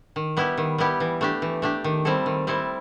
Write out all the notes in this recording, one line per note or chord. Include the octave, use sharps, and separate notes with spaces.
D#3
G3 B3 E4 G4
D#3
G3 B3 E4 G4
E3
A3 D4 G4
E3
A3 D4 G4
D#3
G3 C4 E4 A4
D#3
G3 C4 E4 A4